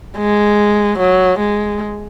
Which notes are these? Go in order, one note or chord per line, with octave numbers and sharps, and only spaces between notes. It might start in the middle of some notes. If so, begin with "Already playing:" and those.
G#3
F#3
G#3